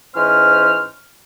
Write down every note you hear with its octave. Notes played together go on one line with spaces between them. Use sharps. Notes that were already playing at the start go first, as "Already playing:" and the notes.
G#2 E3 C#4 C5 F6